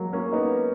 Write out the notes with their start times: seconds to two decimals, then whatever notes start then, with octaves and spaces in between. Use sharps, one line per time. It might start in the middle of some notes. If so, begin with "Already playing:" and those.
Already playing: F#3 G#3 A#3
0.13 A#3 C#4
0.33 B3 D#4